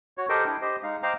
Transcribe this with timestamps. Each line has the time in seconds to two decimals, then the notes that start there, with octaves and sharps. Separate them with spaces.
0.18 F#4 C#5
0.29 G4 A4 A#4 C5 D#5 G5
0.45 D4 E4 G5
0.61 G4 C5 D#5
0.83 G#3 D#4 F5
1.03 C5 D#5 F5 G5 A#5 D6